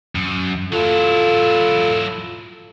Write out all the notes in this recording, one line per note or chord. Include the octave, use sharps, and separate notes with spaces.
F#2
F#3 E4 F4 A4